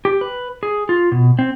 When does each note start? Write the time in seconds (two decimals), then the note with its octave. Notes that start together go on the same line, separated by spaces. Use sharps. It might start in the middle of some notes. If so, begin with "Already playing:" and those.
0.05 G4
0.21 B4
0.63 G#4
0.89 F4
1.12 B2
1.39 C4